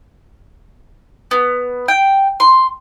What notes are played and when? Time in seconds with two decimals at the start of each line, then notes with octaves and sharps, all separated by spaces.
1.31 B3
1.88 G5
2.40 C6